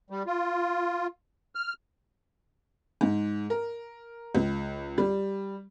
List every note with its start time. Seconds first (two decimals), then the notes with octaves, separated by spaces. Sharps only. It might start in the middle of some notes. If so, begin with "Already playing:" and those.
0.10 G3
0.26 F4
1.55 F6
3.01 G#2
3.50 A#4
4.35 C#2
4.98 G3